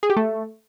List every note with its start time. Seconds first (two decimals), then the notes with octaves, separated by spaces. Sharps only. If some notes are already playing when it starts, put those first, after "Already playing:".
0.03 G#4
0.10 G4
0.17 A3